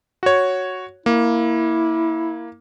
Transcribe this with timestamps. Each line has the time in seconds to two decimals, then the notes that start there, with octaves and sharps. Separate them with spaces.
0.23 F#4 C#5
1.06 A#3 E4